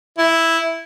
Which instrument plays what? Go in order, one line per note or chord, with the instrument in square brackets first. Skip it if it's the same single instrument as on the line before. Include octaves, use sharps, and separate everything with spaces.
[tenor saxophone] E4